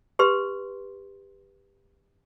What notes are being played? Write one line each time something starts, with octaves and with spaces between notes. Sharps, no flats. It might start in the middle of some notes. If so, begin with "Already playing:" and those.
G4 B4 C6